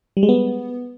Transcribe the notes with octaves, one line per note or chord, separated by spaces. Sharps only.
G3
G#3
B3